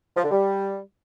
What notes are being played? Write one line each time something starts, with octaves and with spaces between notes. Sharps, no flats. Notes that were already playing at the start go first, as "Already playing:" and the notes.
F3
D3
G3